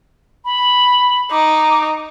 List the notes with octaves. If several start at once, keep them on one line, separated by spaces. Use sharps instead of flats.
B5
D#4 D6